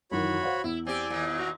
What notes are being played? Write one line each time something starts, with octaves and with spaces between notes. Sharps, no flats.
F#2 D#3 E3 F#4 C#5 B5
C5 F5 F#5
E2 E4
C4 G4 D5 G#5
D#2 A#2
F#4 A#5